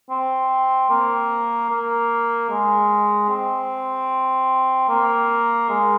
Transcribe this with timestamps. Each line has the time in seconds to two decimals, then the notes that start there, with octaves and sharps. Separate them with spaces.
0.10 C4
0.90 A#3
1.70 A#3
2.50 G#3
3.29 C4
4.89 A#3
5.69 G#3